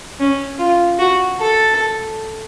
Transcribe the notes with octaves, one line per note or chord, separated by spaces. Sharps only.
C#4
F4
F#4
A4